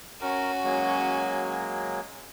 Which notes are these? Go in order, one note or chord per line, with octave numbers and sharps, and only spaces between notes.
C#4 F#4 A#4
F#3 G#3 A#3